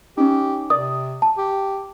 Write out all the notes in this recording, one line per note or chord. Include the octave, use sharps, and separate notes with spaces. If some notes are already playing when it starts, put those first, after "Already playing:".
C#4 D#4 G4
C3 D5 D#6
A5
G4